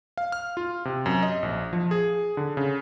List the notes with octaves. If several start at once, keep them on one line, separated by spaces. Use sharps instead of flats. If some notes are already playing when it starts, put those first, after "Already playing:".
F5
F6
F4
C3
F#2
D#5
A#1
F3
G#4
D3
C#3